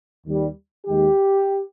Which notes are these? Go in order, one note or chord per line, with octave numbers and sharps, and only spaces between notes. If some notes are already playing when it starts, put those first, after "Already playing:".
D#2 D#3 G3
D#2 D#3 G#3 G4